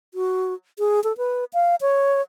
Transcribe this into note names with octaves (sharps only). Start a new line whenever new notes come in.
F#4
G#4
A4
B4
F5
C#5